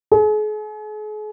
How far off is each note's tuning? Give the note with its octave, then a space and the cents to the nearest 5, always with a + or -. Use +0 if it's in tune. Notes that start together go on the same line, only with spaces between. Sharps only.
G#4 +40